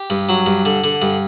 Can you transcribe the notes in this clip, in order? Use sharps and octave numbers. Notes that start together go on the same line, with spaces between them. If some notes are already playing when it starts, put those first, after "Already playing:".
Already playing: G4
G2
F#3
G2
D3
D3
G2